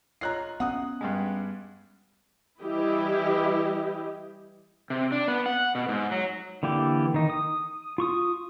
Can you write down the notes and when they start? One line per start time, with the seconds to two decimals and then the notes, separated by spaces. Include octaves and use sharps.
0.21 F4 C#5 D#5 A#5 F#6 C7
0.60 B3 C#4 F#5 D#6 F#6
1.01 G2 G3 G#3
2.61 E3 G3 E4 G4 D#5
4.90 C3
5.12 D4
5.28 B3
5.46 F#5
5.75 B2
5.89 G#2
6.12 F#3
6.63 D3 E3 A#3 G4 D5
7.14 D#3 D#4
7.30 D#6
7.98 F4 C#6 D#6